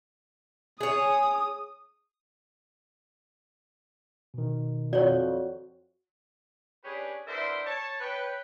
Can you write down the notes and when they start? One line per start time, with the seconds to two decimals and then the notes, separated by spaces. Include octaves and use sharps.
0.81 G#4 C#5 D#6
4.34 B2 D#3
4.93 F2 F#4 C#5 D5
6.85 C#4 D4 G4 G#4 B4
7.27 B3 D4 E4 A#4 C5 E5
7.65 C#5 A5
8.00 B4 C#5 G5